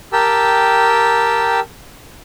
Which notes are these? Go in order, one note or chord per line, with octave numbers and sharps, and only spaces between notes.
G4 A#4 G5 A5 E6